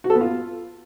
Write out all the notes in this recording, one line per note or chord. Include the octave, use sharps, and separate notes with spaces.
F#4
A4
B3
F4